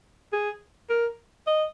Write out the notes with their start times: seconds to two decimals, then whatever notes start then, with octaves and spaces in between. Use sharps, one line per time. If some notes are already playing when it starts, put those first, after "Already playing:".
0.33 G#4
0.89 A#4
1.47 D#5